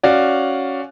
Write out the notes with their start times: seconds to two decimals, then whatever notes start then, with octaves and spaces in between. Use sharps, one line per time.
0.03 C#4 F#4 D5 F5